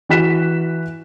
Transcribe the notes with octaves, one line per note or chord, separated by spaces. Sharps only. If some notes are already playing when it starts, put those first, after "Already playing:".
E3 F#4 F#6 B6 E7